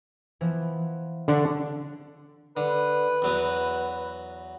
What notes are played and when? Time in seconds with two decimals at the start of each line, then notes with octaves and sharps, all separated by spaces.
0.41 E3 F3 B3
1.28 D3 D4 D5 F#5 C#6
2.57 D3 B4
3.22 E2 F#3 B3